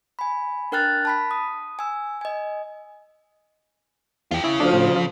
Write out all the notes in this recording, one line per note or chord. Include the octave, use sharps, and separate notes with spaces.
G#5 B5
D4 A#4 G5 F6 F#6 A6
A5 B5 B6
D#6
G#5 E6
D#5 G#5
E2 F4 G4
C#3 E4
D2 F3 D4
A2
F3